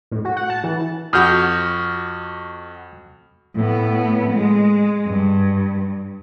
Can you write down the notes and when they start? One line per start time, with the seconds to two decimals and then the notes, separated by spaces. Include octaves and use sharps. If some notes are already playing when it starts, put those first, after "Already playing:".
0.11 A2
0.25 F#4
0.37 F#5
0.50 A5
0.64 E3
1.13 F2 F#4 D#6 F6 G6
3.56 A2 B3
4.30 G#3
5.07 G2